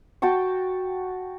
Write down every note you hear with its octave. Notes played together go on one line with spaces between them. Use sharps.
F#4 G5 A5 C#6